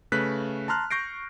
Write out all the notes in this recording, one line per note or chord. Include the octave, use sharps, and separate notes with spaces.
C#3 A3 B4 F#6 B6
A5 A#5 C6 F6 F#6
C#6 G6 A#6 C7 D7